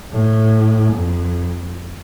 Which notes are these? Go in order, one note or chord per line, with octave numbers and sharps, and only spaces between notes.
A2
F2